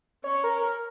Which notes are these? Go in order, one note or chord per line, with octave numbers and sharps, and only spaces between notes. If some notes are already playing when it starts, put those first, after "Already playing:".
C#4 C#5
A#4
A#4